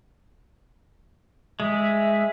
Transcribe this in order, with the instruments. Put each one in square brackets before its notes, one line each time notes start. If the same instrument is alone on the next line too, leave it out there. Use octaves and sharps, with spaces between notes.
[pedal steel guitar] G#3 [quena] E5